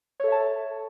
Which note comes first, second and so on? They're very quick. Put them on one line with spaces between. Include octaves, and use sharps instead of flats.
C#5 A4 E5 A5